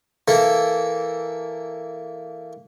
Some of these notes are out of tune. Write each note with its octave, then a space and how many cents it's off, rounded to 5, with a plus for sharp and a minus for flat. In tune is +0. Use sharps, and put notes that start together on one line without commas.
E3 +0 A#3 -10 A4 +0